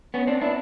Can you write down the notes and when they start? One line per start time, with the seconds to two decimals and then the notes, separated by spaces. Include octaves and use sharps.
0.14 B3 C#4
0.27 C4 D4
0.41 D4 E4